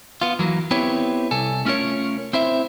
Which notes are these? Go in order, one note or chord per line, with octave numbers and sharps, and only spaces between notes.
B3 F4
E3 F#3 A#3
B3 C4 E4 G4 B4 C#5
C2 A4 G#5
A3 C#4 F4 A#4 C#5
C4 E4 C5 E5